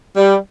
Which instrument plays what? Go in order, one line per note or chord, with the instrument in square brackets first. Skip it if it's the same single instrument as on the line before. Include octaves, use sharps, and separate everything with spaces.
[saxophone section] G3